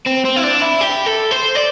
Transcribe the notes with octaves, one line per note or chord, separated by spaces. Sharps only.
C4
C4
E4
D4
E4
G4
A4
C5
D5